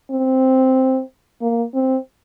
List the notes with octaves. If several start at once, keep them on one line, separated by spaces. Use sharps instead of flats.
C4
A#3
C4